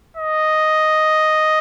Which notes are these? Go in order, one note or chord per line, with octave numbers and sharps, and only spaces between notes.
D#5